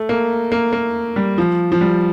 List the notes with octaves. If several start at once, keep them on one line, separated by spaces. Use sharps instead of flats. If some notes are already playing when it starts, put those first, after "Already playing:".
Already playing: A3
A#3
A#3
A#3
G3
F3
F3
G3